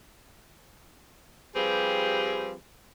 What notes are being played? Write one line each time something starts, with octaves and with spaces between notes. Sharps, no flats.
F3 G3 C4 G4 G#4 B4